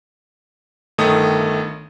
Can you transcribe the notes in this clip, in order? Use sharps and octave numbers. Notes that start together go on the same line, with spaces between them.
G1 D#3 A3 D#6